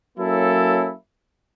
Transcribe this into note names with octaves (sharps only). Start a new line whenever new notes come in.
F#3 A#3 C#4 E4 A4